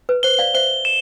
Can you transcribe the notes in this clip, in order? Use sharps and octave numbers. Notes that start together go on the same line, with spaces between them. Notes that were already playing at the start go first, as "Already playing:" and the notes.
B4
C5 G7
D5 F5
C5 E5 G7
E7